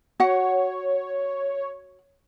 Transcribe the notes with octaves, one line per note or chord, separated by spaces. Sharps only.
F#4 C#5 F#5